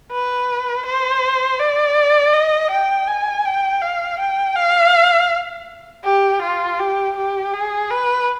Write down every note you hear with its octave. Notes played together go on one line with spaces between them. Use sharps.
B4
C5
D5
D#5
G5
G#5
G5
F5
G5
F5
G4
F4
G4
G4
G#4
B4